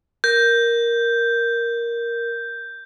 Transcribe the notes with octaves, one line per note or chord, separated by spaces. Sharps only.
A#4 G6